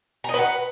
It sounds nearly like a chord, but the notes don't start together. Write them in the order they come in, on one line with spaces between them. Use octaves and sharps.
A#5 D#5 B4 F#5